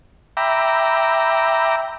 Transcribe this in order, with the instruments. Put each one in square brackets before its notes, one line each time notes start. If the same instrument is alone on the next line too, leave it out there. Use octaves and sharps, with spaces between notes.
[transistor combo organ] E5 G5 A#5 B5 D6